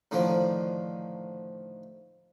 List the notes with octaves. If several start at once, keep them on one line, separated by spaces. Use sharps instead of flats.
A2 D3 D#3 F3